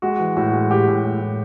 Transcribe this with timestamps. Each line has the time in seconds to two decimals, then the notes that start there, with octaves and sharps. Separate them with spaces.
0.02 G#3 F#4
0.19 E3
0.37 A2 F#4
0.53 G#3
0.70 A2 G4
0.88 A2
1.04 A2
1.21 A2